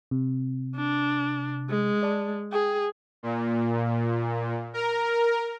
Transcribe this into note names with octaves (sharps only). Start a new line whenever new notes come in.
C3
D4
G#3
D5 A5
G#4 G5 G#5
A#2
A#4